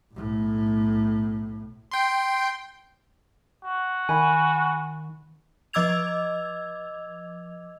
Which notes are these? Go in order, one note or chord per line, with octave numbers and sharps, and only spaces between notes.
B1 A2
G5 C6
F#4
D#3 G#5 B5
F3 D#5 D6 E6 G#6 F7